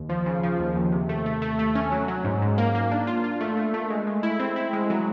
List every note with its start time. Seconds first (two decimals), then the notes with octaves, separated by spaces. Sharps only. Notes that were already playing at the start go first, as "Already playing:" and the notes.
Already playing: D#2
0.09 F3
0.26 C#3
0.43 F3
0.60 D#2
0.75 D#2
0.92 C3
1.09 A3
1.26 A3
1.42 A3
1.59 A3
1.75 C#4
1.92 F#3
2.08 F#3
2.24 G#2
2.42 G#2
2.58 A#3
2.75 A#3
2.92 D4
3.07 F4
3.24 F4
3.41 A3
3.57 A3
3.74 A3
3.90 G#3
4.07 G#3
4.23 E4
4.40 C4
4.56 E4
4.73 G#3
4.90 F#3